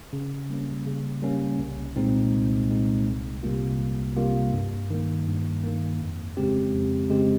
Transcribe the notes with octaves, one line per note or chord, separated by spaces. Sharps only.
C#3
G3 A#3 C#4
C#3
G3 A#3 C#4
C2
A#2 G#3 C4 D#4
C2
A#2 G#3 C4 D#4
C2
C3 G3 A#3 F4
C2
C3 G3 A#3 F4
G2
D#3 A#3
G2
D#3 A#3
F2
C#3 G#3 C4 G4
F2
C#3 G#3 C4 G4